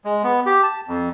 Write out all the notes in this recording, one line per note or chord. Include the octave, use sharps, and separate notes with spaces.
G#3
B3
G4
A5
F2